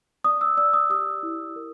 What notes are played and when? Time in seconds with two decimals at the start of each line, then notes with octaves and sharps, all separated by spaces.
0.24 D5 D#6
0.41 E6
0.57 D5 E6
0.74 D#6
0.90 G4 D#6
1.23 E4
1.56 A#4